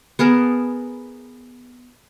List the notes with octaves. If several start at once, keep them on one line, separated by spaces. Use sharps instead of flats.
B3 G#4 A#4 A5